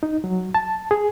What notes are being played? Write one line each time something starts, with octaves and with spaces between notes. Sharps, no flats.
D#4
F#3
A5
G#4